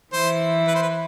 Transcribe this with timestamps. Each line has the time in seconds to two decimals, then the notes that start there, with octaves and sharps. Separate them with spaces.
0.13 E3 E4 C5
0.68 B4
0.75 C5
0.82 B4